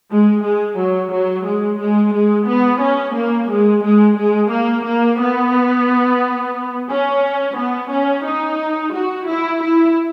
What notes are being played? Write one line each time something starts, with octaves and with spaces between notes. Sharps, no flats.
G#3
G#3
F#3
F#3
G#3
G#3
G#3
B3
C#4
A#3
G#3
G#3
G#3
A#3
A#3
B3
C#4
B3
C#4
D#4
F#4
E4
E4